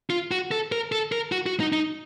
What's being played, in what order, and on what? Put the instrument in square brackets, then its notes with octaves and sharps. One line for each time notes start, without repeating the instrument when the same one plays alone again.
[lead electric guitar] F4
F#4
A4
A#4
A4
A#4
F#4
F#4
D#4
D#4